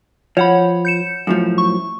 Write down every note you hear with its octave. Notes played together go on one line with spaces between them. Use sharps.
F3 C#5 F#5 B5
G6 C#7 E7
F#2 A2 F3
C#6